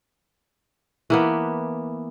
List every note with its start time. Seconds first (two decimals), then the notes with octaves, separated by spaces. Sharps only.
1.10 E3 A#3 B3